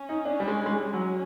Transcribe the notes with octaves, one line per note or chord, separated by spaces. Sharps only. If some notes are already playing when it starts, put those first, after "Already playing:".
Already playing: C#4
D#4
D4
G3
G#3
G#3
G3
F#3 C#4